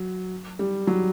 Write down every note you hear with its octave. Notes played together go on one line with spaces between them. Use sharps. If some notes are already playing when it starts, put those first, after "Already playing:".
Already playing: F#3
G3
F#3